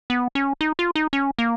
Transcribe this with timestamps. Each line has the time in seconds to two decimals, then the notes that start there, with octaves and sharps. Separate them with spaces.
0.10 B3
0.35 C#4
0.61 D#4
0.79 F4
0.95 D#4
1.13 C#4
1.39 A#3